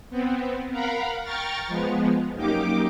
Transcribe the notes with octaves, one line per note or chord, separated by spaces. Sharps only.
B3 C4
A#4 F5 F#5 A#5 B5
G5 A#5 C#6 F6 A6
F3 G#3 B3
F#2 A#3 D#4 G4 D6